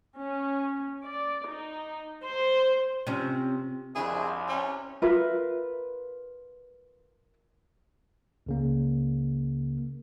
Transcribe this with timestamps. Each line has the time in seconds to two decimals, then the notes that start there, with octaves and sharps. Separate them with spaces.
0.17 C#4
1.04 D5
1.49 D#4
2.23 C5
3.07 C3 F3 C#4
3.95 C2 F2 D4 E4 G#4
4.49 C#4
5.02 F4 A#4 B4 E5
8.46 C#2 C#3 A#3